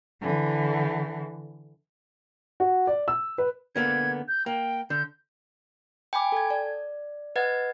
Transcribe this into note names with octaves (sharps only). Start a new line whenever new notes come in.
D3 E3
F#4
D5
E6
B4
D3 A#3 B3 G#6
G6
A#3 G5
D3 G6
G5 G#5 B5 D6
A4 G#6
D5
B4 D#5 F#5 G#6 A6